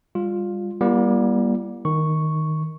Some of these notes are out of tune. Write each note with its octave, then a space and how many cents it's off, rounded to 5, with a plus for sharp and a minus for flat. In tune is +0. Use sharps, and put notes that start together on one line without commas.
G3 +30 F4 +10
G3 +0 A#3 +45 E4 +40
D#3 +0 C#6 +0